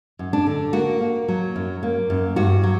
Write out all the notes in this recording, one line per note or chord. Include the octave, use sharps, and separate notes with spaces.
F#2
D4
D3
A#3 F#4
A#3
F#3
F#2
A#3
F#2
G2 F#4
F#3